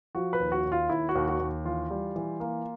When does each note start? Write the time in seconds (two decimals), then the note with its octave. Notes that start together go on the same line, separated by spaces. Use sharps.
0.15 F3 F#4
0.33 B4
0.40 D#2
0.52 F#4
0.65 D#2
0.72 F4
0.89 D#2 E4
1.09 F#4
1.15 D#2
1.28 F#4
1.39 D#2
1.65 E3 F4
1.90 G3
2.16 E3
2.40 A#3